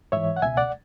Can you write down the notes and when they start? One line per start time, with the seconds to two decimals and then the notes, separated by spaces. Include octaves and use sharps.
0.12 G#2 E3 C#5 E5
0.36 F#5
0.42 C#2 B2 E5 G#5
0.57 D5 F#5